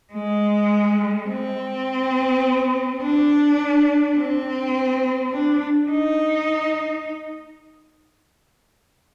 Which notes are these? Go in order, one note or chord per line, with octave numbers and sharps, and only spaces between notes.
G#3
C4
D4
C4
D4
D#4